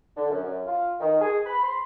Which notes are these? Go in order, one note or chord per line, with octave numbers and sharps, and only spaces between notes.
D3
F#2
F#2
F4
D#3
G#4
B5
C6